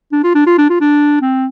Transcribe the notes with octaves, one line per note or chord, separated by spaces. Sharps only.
D4
F4
D4
F4
D4
F4
D4
C4